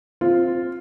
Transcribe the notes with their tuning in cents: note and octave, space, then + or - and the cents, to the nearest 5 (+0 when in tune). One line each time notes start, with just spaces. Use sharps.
C4 +0 F4 +0